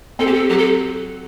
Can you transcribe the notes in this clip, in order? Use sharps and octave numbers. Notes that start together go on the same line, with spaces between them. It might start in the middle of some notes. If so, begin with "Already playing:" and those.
C4 A4
G4
A4
F#3 G4
A4